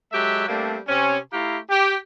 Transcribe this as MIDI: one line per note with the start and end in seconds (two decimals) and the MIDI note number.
0.13 0.47 54
0.13 0.47 56
0.13 0.47 67
0.13 0.47 69
0.13 0.47 76
0.47 0.78 55
0.47 0.78 57
0.47 0.78 58
0.47 0.78 60
0.47 0.78 62
0.87 1.17 48
0.87 1.17 60
0.87 1.17 61
1.32 1.58 57
1.32 1.58 64
1.32 1.58 67
1.32 1.58 77
1.32 1.58 82
1.70 1.95 67